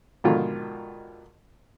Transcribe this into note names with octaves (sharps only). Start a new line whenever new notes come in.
G#2 B2 D3 D#3 F3 F4